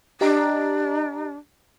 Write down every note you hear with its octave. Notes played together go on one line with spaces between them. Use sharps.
D4 G4 D#5 A#5